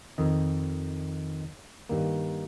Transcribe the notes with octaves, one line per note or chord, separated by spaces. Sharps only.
F2 D#3 D#5
G2 D#3 A#3